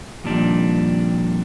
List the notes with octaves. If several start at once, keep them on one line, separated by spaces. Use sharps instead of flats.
F2 A#2 D#3 G3 D4